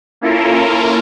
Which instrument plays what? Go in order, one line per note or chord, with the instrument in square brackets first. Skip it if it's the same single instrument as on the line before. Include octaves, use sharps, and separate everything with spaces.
[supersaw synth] A#3 C#4 E4 F4 A4 A#4